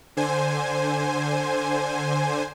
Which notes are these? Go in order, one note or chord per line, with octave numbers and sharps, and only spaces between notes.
D3 C5 G#5